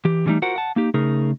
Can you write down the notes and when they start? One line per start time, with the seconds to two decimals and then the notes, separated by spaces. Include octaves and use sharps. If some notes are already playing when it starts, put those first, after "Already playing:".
0.05 E3 G4
0.26 D3 E3 G3 A3 D#4
0.42 F4 F#4 A#4 C5 F#5
0.56 F#5 A5
0.76 A#3 D#4 G4
0.94 C#3 A3 D#4 G#4 A#4